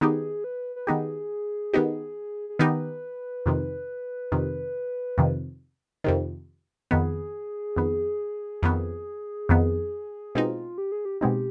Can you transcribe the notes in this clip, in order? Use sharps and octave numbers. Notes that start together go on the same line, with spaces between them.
D#3 B3 D#4 G4 G#4
B4
B4
D#3 B3 D#4 G4 G#4
D#3 B3 D#4 G4
G#4
D#3 B3 D#4 G4 B4
F2 C3 D#3
F2 C3 D#3
F2 C3 D#3
F2 C3 D#3
F2 D#3 B3 G#4
F2 D#3 B3
F2 D#3 B3
F2 D#3 B3
B2 G#3 C4 D#4 F4
G4
G#4
G4
B2 G#3 C4 D#4 G4